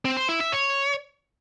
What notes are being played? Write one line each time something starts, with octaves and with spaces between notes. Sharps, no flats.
C4
C5
E4
E5
C#5